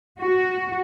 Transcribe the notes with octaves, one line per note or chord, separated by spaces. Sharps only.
F#4